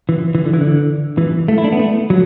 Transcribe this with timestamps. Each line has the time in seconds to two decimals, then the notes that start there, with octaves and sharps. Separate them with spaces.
0.09 E3
0.35 E3
0.45 D3
0.54 E3
0.61 D3
1.18 E3
1.48 A3
1.58 E4
1.64 D4
1.72 B3
1.79 A3
2.10 F#3